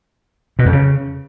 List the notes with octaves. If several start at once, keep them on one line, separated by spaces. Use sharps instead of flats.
B2
F2
C#3